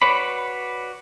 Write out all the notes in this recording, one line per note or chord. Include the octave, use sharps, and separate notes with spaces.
F#4 B4 C#5 D5 B5